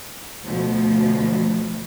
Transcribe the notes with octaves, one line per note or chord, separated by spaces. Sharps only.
D2 B2 F3 A3